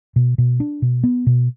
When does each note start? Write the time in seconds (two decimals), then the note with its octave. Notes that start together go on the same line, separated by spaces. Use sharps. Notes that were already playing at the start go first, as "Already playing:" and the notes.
0.16 B2
0.38 B2
0.60 D4
0.82 B2
1.03 B3
1.27 B2